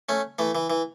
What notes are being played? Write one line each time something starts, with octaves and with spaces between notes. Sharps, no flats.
A3 C#4
E3 A3
E3
E3